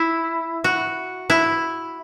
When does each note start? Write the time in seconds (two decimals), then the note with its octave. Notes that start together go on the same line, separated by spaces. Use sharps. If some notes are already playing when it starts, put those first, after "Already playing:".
Already playing: E4
0.64 F#4
1.30 E4